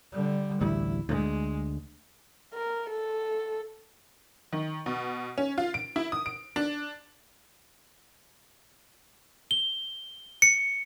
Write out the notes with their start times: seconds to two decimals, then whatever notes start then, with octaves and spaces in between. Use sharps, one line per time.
0.12 D3 G3
0.61 A1 D2 G3 E4
1.09 D2 G#3
2.54 A#4
2.89 A4
4.53 D#3
4.86 B2
5.38 C#4
5.58 F4
5.74 D7
5.96 E4
6.12 D#6
6.26 D7
6.56 D4
9.51 G7
10.42 C#7